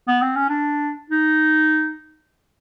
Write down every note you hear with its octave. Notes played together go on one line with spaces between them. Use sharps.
B3
C4
C#4
D4
D#4